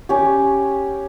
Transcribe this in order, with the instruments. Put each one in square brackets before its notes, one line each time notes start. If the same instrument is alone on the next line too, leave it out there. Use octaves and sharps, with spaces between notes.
[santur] C#4 G4